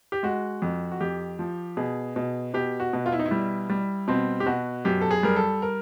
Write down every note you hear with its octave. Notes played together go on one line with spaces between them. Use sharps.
G4
G#3 F#4
F2
F#4
F2 G4
F3
B2 G#4
B2
B2 G4
F#4
B2
F4
E4
D#4
E4
G3
G3
B2 C4
G4
B2 F#4
F#2 G4
A4
G#4
G3 A#4
A4
A#4